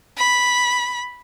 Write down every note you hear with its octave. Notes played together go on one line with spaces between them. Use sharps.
B5